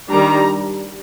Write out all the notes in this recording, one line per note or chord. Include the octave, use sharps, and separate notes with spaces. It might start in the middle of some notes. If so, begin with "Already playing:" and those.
D#3 G3 D4 A#5